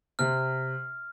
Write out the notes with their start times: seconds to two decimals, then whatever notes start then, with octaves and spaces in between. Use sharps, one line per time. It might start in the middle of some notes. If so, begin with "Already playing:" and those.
0.19 C3 F6